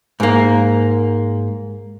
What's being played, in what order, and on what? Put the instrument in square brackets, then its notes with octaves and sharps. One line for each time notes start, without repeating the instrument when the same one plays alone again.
[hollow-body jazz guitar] G#2 A#3